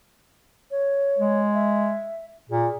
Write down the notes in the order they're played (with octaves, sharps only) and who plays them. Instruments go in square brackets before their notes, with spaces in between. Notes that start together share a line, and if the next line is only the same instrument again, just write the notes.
[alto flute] C#5
[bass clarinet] G#3
[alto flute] E5
[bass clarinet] A#2 [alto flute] G#4